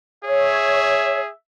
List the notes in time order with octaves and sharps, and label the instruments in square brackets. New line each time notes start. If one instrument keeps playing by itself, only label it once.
[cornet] G#4 [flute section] C#5 [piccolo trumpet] E5